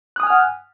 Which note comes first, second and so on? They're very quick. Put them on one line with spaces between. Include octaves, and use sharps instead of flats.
F#6 D#6 G#5 F6 F#5